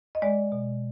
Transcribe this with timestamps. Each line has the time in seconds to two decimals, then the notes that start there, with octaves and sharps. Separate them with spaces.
0.15 D#5
0.22 G#3 D5
0.52 B2